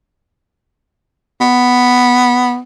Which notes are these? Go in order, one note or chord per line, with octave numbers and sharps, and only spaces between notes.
B3